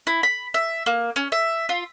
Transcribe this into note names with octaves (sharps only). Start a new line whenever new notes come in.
E4
B5
E5
A#3
C#4
E5
F4